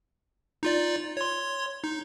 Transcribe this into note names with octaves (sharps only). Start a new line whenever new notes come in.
D#4 F4 D5
C#5 C6
D#4